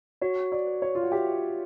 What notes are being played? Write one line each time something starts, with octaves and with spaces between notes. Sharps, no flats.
F#4 C#5
D5
B4
C#5
F4
F#4
G4 E5